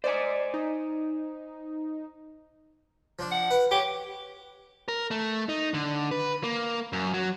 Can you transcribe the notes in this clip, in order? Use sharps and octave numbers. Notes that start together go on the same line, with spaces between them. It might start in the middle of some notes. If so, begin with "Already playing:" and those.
C5 D5 D#5 G#5
D#4
F3 D4
F#5
B4
G4 C#5
A#4
A3
D#4
D3
B4
A#3
F#2
F#3